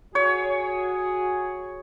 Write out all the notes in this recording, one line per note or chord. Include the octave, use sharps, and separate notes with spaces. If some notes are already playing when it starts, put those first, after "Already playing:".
F#4 G#4 C#5